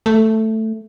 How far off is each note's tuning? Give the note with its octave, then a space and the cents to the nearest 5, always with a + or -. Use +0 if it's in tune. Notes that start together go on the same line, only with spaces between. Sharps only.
A3 +5